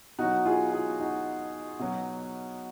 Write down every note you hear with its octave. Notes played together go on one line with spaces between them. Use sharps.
B2 F#3 D#4 F#4
F4 G#4
F4 G#4
D#4 F#4
B2 F#3